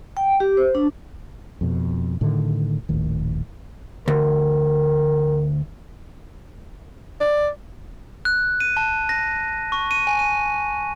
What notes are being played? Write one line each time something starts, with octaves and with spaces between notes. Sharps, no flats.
G5
G4
C5
D4
F2 B2
A2 D3 D#3
D#1 A#1 A2 D#3
D2 A#4
D5
F#6
D#7
A5
A#6
C#6
D#7
G#5
D#7